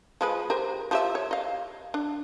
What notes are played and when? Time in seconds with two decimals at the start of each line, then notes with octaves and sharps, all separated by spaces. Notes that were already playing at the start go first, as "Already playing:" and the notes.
0.21 F3 G#3 B4
0.50 G4 A#4 C5
0.91 F3 G4 E5
1.15 C#5
1.31 D#5 F5
1.94 D4